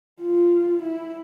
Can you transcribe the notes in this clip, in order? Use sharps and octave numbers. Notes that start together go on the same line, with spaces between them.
F4
E4